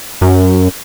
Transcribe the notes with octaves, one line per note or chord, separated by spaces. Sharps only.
F#2